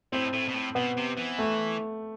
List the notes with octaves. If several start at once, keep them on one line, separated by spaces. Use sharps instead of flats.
A2 C4
A2
B2
A2
B2 B3
C3
E3
A3